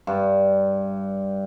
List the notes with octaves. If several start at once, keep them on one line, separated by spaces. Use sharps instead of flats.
G2